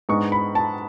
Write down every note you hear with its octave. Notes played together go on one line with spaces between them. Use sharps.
G#2 G#3 B3 D4 C#6
B5
A5